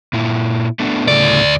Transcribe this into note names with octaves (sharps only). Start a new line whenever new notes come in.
A#2 E4
A3 B3 D4
D2 A2 C#3 A3 D5